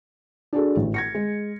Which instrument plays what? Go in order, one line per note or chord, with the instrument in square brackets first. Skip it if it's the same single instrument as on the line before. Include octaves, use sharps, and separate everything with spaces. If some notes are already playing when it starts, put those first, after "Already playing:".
[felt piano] D4 F#4 G#4 A4
A1
G#6 A#6 C#7
G#3